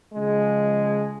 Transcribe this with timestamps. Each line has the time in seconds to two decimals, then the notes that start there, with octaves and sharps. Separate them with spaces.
0.14 C#3 F3 G#3